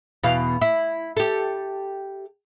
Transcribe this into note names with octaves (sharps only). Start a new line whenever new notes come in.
E2 B2 F5
E4
G4 A4